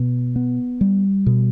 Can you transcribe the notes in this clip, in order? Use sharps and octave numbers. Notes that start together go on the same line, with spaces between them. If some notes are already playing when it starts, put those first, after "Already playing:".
Already playing: B2
B3
G3
B2